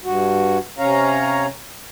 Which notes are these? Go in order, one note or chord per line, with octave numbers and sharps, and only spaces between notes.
G2 F#4
C3 C#4 C#5 F5 A#5